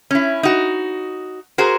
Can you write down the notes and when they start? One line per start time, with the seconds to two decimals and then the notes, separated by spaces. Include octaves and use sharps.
0.11 C#4 E4
0.43 D#4 F#4
1.58 F#4 G#4 A#4 C5